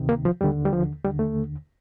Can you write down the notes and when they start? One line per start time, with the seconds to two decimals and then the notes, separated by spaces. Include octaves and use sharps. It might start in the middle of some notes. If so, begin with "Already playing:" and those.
Already playing: D2 C3 D#3
0.09 A#3
0.25 F3
0.41 D#2 D3 G3
0.65 G3
0.73 F3
1.04 D#2 D3 G3
1.19 A3